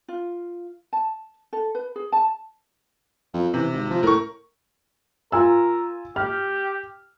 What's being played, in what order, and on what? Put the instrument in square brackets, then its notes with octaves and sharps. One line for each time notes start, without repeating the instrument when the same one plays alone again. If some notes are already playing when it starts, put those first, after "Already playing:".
[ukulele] F4
A5
A4
B4
G#4
A5
[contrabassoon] F2
[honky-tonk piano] C3 [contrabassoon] E3
[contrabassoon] G#1
F3
[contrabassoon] A2 [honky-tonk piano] A#4 C#6
[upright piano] F4 G#5 E6 [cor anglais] A#4
[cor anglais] G4 [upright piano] F6